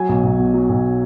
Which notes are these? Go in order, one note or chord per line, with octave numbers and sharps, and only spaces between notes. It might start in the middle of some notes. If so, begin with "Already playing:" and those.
Already playing: F#3 G#5
B1
B1
B2
F#3
B1